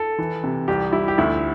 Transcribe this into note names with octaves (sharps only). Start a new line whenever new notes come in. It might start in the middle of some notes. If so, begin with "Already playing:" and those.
Already playing: A4
E3
C3
C2 G4
G3 E4
G4
D2 E4